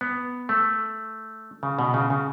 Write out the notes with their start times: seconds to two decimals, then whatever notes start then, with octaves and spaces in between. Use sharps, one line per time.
0.01 B3
0.49 A3
1.63 C#3
1.79 B2
1.94 C#3
2.10 C#3